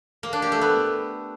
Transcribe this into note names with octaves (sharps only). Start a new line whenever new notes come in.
A#3
D4
G4
A3
B3